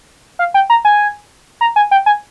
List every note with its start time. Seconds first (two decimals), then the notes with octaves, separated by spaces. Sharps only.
0.39 F5
0.54 G5
0.70 A#5
0.85 G#5
1.61 A#5
1.76 G#5
1.91 G5
2.06 G#5